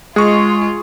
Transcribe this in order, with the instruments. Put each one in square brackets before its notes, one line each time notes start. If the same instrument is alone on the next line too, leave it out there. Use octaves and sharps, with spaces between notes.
[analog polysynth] G#3 [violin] F4 [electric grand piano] G#4 C#6